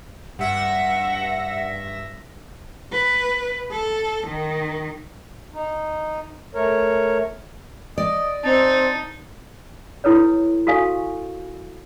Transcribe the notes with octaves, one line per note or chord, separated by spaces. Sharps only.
G2 E5 F#5 A#6
B4
A4
D#3
D#4
A3 A#4 C#5
D5 D#5
C4 D#4 A5
E4 A4 B4 C#5
F#4 G4 A4 F5 G#5 C#6